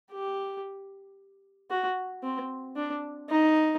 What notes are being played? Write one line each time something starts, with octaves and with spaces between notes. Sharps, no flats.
G4
F#4
C4
D4
D#4